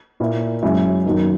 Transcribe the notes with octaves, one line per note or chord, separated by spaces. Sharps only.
A#2 A#3 E4
F#2 C#3 G#3 C#4 E4
F#2 D#3 A#3 D#4 A#4